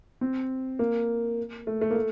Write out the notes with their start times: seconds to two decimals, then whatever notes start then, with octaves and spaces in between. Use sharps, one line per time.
0.21 C4
0.79 A#3
1.67 A3
1.81 A3
1.90 A#3
1.96 A3